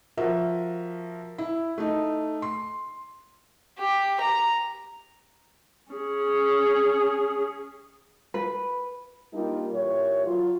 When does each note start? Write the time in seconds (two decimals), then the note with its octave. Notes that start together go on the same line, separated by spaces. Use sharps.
0.17 F3 F#4 A#4 E5
1.38 E4
1.78 A3 D#4
2.42 C6
3.79 G4
4.20 A#5
5.92 C#4 G#4
8.34 B4
9.33 G3 A#3 D4 D#4 F4
9.71 A#2 E3 G4 C#5
10.26 F#3 F4